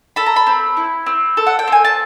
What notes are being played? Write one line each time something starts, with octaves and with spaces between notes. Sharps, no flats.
A4 B5
A#5
B5
C4
E4
C4
A4
F#5
G5
C4 G#5
A5